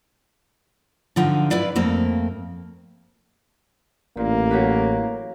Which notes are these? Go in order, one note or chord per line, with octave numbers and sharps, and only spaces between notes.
D3 F3 D#4 F4 F#4
E4 B4 D5 F5
F2 A3 A#3 C4
A1 A#2 A#3
F#3 G4 B4